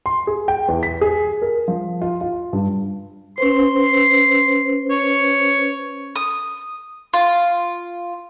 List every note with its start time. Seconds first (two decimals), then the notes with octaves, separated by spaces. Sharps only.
0.06 C6
0.27 G#4
0.48 G5
0.68 E2
0.83 B6
1.01 G#4
1.42 A#4
1.68 F3
2.02 F4
2.21 F4
2.53 G2
3.38 C#4 B4 C5 C6
4.90 C#5
6.16 D#6
7.13 F4